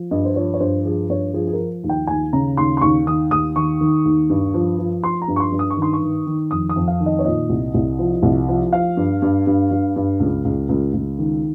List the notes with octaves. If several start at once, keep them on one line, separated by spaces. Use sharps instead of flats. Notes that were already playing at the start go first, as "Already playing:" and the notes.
Already playing: F3
G2 D#5
C5
F3 C#5
C#5
G2 C5
F3 G#4
G2 C#5
F3 G#4
G#4
A#4
F3
D#2
G5
D#2 G#5
C#3 A#5
D#2 C6
C6
D#2 C#6
D#3 D#6
D#2 D#6
D#3 C#6
D#3
D#2
G2
F3
F3
F3 C6
A#5
G2
C#6
C6
G2
D#6
C#6
D#3
C6
C#6
D#3
D#3
F2 D#6
D#6
F2
F5
D#3
D#5
C#5
A#2 D#5
C2
C2
F3
C2
F3
F3 F5
G2
G2
G2
G2
G2
C#2
C#2
C#2
C#2
D#3